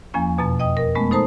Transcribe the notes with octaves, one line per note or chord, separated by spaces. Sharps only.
E2 F3 A#3 C#4 G#5
F2 B2 A#5 A6
D#5 G5 D#6
A#4
G#3 A3 B3 C#4
D#4 A4 C5 A5 A#5 D#6